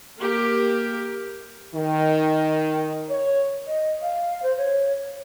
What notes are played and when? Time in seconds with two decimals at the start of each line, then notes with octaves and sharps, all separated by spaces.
0.19 A#3 G4 A#4
1.74 D#3
3.09 C#5
3.67 D#5
4.02 F5
4.43 C5
4.58 C#5